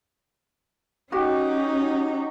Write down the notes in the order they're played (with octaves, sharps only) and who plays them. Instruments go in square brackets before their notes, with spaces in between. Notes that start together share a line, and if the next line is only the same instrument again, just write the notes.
[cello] C#4 D#4 [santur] F#4 G4